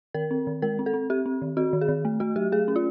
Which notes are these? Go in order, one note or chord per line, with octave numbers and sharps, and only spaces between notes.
D#3 A#4
C4
D#3
G#3 A#4
C4
A4
C4
C4 G4
C4
D#3
C4 F#4
D#3
G#4
D#3
A3
A3 F#4
F#3 G4
A3 G#4
C#4
F4